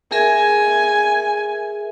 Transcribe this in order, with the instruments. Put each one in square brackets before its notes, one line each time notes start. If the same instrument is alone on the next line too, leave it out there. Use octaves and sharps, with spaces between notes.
[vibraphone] G#4 A#4 E5 [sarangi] G#5